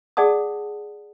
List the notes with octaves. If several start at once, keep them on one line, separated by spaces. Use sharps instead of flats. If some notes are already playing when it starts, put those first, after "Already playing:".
G#4 D5 F#5 A5 D#6